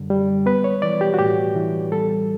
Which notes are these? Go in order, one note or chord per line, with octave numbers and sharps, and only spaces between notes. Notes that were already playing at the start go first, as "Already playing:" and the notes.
Already playing: F#2 D3 G3
G3
B3 B4
C#5
E3 D5
G4
F#4
A2 G4
E3
G3 A4